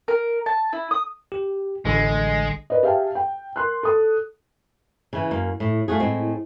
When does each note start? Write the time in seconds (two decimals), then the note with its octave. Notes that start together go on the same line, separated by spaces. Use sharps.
0.08 A#4
0.46 A5
0.73 E4
0.91 D#6
1.32 G4
1.85 A1 D3 G#3
2.70 A#4 B4 D5 D#5
2.83 G4 G#4 E5 F5 G5 A5
3.15 G5
3.56 A#4 C6 F#6
3.83 A4 D#6
5.13 C#3 E3
5.31 F#2 A#3
5.60 A2
5.88 A3 F4 F#4 G#4
6.00 A2 G#3 C4